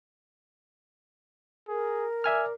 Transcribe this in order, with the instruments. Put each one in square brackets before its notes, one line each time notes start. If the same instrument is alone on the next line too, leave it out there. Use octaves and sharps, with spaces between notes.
[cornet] G#4 [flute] A#4
[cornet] D5 [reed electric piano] E5 G#5 F6